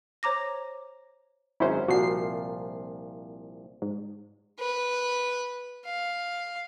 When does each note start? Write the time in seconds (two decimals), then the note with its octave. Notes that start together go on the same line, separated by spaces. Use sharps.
0.23 C5 C#5 A#5 D6 A#6
1.60 G#1 F#3 C#4 E4 C5
1.88 C2 A#2 F3 F#4 C7
3.82 G#2
4.60 B4
5.86 F5